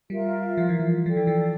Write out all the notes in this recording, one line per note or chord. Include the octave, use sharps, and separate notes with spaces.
G3 F4 A#4 E5
F3
E3
F3
F3 A4 D5 G5
E3
F3